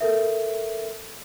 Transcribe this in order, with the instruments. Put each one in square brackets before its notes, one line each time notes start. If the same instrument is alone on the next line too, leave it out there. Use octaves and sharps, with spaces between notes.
[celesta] A4 A#4 E5